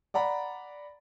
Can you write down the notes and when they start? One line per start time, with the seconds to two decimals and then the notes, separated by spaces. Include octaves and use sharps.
0.14 D5 F#5 A#5 B5